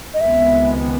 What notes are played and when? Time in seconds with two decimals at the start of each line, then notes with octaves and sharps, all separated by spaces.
0.14 D#5
0.21 C#2 C3 D#3 G#3 B3 E5